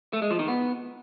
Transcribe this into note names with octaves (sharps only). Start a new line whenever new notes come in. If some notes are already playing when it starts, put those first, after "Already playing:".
A3
G#3
F3
D#3
B3